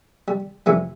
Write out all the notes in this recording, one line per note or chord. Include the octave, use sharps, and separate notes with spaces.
G3
F2 C3 E3 G3 A3